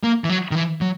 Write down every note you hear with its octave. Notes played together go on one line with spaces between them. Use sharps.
A#3
E3
F#3
D#3
E3
F#3